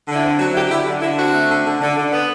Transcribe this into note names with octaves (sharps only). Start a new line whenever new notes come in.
D3
E4
C4
F#3 F#4
D3 E4 G4
D3 E4 G4
D3
D3 E4
C4 F#4
A3
D3
D3
D3
D3
B3